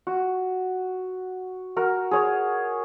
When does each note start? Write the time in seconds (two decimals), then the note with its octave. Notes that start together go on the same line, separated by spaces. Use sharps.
0.07 F#4
1.76 F#4 A#4
2.11 G#4 C#5